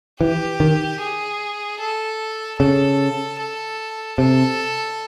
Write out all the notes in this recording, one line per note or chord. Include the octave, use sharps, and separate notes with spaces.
E3 G4
D#3
G#4
A4
C#3 A4
A4
C3 A4